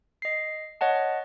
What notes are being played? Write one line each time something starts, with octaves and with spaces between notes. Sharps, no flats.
D#5 C7
C#5 D#5 F#5 A5